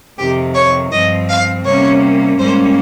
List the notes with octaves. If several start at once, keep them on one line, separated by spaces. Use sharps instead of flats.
F2 C3 D#3 G4
C#5
G2 F3 C4 D#5
F5
C3 G3 A#3 C#4 C#5
G#2 G3 A#3 C#4 C5